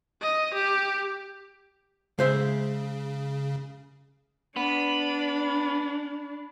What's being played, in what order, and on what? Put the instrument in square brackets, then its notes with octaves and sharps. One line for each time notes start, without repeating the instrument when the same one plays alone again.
[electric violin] D#5
G4
[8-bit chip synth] C#3 [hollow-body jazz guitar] G#3 C5 E5
[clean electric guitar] B3 [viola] D4 [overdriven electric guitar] B5